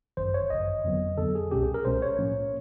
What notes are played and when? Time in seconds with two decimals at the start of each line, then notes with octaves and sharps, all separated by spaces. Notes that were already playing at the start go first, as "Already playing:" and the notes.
0.17 G1 F#2 D#3 C5
0.34 C#5
0.50 G1 F#2 D#3 D#5
0.84 F2 D3 F#3 B3
1.18 F2 D3 F#3 B3 A4
1.35 G#4
1.51 C2 B2 G#3 C#4 G4
1.63 G#4
1.74 A#4
1.85 C2 B2 G#3 C#4 C5
2.02 C#5
2.19 A2 F3 A#3 C#4